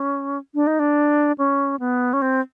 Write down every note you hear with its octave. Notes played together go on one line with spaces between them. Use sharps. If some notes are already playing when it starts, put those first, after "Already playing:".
Already playing: C#4
D4
D#4
D4
C#4
B3
C#4
C4